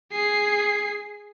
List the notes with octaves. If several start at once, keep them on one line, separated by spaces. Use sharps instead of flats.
G#4 C7